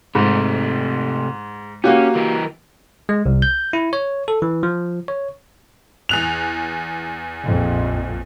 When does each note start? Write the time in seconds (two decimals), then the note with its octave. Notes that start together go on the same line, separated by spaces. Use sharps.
0.15 G#2 C3 A3
1.84 A#3 C#4 F#4 G4
2.15 E3 A#4
3.09 G#3
3.26 C2
3.42 G6
3.73 E4
3.93 C#5
4.28 A4
4.42 E3
4.63 F3
5.08 C#5
6.09 E2 F#6 F7
7.46 A#1 F2